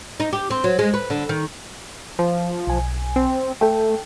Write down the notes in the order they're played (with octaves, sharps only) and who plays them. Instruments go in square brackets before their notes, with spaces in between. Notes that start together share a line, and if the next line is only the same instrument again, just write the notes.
[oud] D#4
G4
C4
F#3
G#3
B4
D3
D#3
[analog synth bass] F3
[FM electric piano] B1 G#5
[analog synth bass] C4
[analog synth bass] A3 [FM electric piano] A4 G5